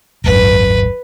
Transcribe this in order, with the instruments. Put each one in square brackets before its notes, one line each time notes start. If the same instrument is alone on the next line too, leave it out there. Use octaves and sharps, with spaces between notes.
[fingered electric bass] D#1 G#1 F#2 [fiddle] B4